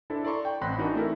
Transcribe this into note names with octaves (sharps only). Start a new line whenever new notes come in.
D4 E4 A4 C5
A4 D5 A#5 C6 C#6
G5
A1 C4 B5 C6 F#6 A#6
E3 D4 D#4 F#4 A#4 B4
A3 C4 E4 A4 A#4